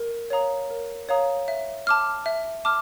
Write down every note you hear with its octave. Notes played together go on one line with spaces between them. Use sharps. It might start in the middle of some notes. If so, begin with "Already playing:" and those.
Already playing: A#4
C#5 F5 A#5 D#6
A#4
C#5 F5 A#5 D#6
E5
A5 D6 F6
E5
A5 D6 F6